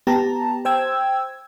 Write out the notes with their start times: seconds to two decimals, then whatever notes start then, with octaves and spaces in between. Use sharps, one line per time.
0.07 B3 G4 A5 A#5
0.65 C5 G5 E6 G#6